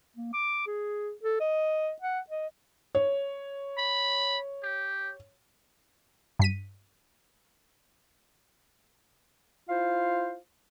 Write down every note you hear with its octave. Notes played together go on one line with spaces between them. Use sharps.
A#3
D6
G#4
A4
D#5
F#5
D#5
C#5
B5
G4
G2 B6 D#7
E4 F4 C5 F5